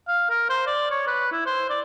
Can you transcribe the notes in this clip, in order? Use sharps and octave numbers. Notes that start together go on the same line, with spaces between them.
F5
A#4
C5
D5
C#5
B4
E4
C5
D5